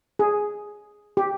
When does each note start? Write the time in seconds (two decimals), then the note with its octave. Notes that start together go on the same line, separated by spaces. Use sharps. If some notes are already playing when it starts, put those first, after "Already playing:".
0.19 G#4
1.17 G4